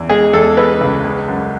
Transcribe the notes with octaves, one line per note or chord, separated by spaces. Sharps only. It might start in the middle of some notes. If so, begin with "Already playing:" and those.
Already playing: E2
G#3 G#4
E2 A4
G#3 B4
C#2
G#3
F#2